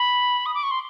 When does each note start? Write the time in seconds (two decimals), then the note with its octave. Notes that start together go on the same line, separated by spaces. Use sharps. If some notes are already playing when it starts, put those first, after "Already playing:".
Already playing: B5
0.46 D#6
0.54 D6
0.63 C#6
0.71 C6